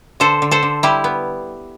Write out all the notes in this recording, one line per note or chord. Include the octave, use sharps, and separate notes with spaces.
D3 A4 C5
D3
A4 C5
D3
G3 E4 G4
B3